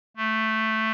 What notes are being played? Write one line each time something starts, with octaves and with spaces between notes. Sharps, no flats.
A3